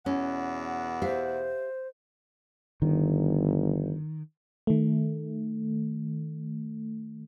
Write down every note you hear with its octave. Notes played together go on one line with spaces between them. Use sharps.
E2 B2 C#4 F#5
G4 C5 E5 F5
G1 D#3
D#3 A3